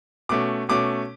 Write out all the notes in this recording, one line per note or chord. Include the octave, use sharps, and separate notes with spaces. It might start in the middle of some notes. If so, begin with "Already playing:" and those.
B2 A3 C#4 D6
B2 A3 C#4 D6